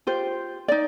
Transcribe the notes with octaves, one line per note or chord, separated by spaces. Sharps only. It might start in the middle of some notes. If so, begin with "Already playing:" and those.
F4 G4 C5
D#4 D5